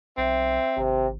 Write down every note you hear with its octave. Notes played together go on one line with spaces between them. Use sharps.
B1 C4 E5
G#1 C3